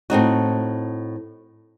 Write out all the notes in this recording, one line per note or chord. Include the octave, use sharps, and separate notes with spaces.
A2 C4 D#4 F#4